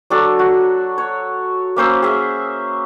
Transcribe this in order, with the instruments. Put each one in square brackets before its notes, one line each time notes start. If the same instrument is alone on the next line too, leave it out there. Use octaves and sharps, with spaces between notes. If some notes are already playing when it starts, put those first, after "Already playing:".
[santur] F#3 D4 A4 C#5
F#4
C#5
A#3 C#4 C5 E6
G#4 E5